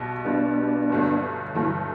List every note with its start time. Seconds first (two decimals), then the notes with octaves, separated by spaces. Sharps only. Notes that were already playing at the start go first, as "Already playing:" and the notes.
Already playing: B1 B2 G3
0.25 B1 B2 G3 B3 D4
0.90 G1 G2 F#3 A3
1.55 G1 G2 E3 F#3 A3